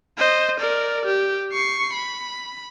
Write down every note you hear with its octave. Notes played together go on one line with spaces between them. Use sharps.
C5 D#5
A#4 D5
G4
C#6 C7
B5